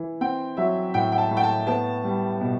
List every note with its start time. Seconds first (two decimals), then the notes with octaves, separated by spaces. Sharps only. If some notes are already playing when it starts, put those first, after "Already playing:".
Already playing: E3
0.21 C4 G5
0.57 F#3 E5
0.94 A2 G5
1.12 G5
1.18 A5
1.31 A2
1.37 G5
1.44 A5
1.67 B3 A5
2.05 G3
2.41 B2